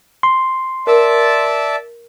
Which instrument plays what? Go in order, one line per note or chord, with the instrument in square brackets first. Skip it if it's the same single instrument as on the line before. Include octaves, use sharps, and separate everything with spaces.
[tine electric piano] C6
[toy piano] A#4 [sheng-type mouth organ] D5 E5 A5